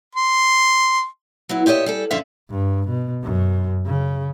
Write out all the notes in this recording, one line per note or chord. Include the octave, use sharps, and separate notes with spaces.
C6
F#3 B3 E4
A#2 G4 C#5 D#5 E5
G3 G#4 A4
F#2 D3 F3 A4 E5 F5
G2
B2
F#2
C#3